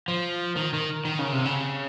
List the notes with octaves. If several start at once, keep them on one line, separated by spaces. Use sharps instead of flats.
F3
D#3
D#3
D#3
C#3
C3
C#3